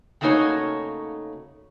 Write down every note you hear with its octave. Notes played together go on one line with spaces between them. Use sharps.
C#3 A3 A#3 D#4 F#4 C#5